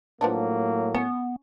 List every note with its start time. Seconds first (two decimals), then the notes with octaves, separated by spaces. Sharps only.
0.21 A2 F3 F#3 A#3 B3 D4
0.94 B3 C#4